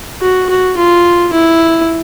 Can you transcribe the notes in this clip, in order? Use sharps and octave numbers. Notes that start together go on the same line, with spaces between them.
F#4
F#4
F4
E4